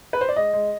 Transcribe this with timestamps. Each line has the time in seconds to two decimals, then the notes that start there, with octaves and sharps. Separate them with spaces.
0.13 B4
0.21 C5
0.28 D5
0.36 G#3 D#5
0.53 G#3